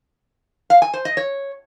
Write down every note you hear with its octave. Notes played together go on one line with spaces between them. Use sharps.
F5
G#5
C5
D#5
C#5